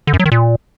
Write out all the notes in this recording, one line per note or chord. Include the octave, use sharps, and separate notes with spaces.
D3
F#2
F#3
D#3
A#2